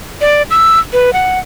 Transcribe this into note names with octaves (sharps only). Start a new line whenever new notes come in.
D5
E6
B4
F#5